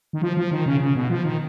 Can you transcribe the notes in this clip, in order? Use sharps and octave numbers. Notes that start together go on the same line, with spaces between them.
D#3
F3
F3
D#3
C#3
C#3
B2
F3
D#3